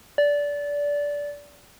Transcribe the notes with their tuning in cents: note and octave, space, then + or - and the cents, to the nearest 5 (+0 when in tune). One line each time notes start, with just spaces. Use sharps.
D5 -20